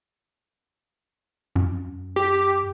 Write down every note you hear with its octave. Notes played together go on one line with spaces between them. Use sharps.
F#2
G4